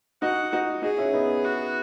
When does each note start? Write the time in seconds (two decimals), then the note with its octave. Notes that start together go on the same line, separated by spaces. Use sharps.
0.22 D#4 F#4 F#5
0.53 D#4 F#4
0.82 D#4 F#4 G#4
0.98 C#4 E4
1.09 E4
1.13 B3 D#4
1.44 F#4